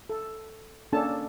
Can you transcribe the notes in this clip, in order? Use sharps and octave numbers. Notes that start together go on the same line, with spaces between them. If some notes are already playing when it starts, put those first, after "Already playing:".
A4
A#3 C#4 D4 A4 A5